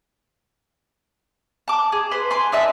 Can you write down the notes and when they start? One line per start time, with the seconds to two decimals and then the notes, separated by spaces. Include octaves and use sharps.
1.68 A5 D6
1.92 G#4
2.11 B4 C5 C6
2.31 G#5 C6 D6
2.52 D#4 D5 E5 A5